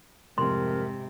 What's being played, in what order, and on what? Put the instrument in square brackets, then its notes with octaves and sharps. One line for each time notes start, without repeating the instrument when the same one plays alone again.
[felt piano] C2 F2 [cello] G#2 C3 [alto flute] A#4 [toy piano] C6